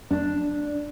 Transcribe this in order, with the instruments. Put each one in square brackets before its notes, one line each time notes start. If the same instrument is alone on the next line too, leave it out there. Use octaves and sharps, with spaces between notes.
[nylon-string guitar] D4